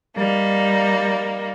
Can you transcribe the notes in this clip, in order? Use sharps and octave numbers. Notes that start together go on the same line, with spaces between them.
G3 A#3 D#4